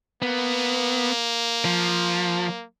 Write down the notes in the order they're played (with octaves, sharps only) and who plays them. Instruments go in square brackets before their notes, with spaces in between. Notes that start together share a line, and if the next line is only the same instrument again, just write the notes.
[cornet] A#3 [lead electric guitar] B3
[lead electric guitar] F3